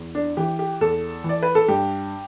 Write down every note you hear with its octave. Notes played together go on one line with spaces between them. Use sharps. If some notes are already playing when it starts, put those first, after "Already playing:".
Already playing: E2
D4
E3 G4
G4
E2 A4
E3
D5
B4
A4
G2 G4